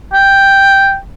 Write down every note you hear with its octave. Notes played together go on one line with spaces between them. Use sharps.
G5